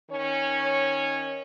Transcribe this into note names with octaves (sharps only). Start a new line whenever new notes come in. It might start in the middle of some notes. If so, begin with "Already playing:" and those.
D#3 C#4 C#5